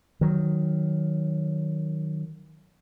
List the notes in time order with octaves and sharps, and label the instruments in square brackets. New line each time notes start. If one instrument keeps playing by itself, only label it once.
[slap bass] D#3 F#3